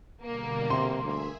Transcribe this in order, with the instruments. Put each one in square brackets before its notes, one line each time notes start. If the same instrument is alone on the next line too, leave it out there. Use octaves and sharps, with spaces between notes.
[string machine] B2 D3 G3 [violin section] A#3
[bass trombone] C3 [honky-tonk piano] C6
[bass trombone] D2 [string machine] G#4 E5 G#5